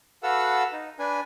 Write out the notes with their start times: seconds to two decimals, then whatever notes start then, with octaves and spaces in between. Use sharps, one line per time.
0.23 F#4 A4 B4 F5 F#5 E6
0.72 D#4
0.99 D4 B4 G#5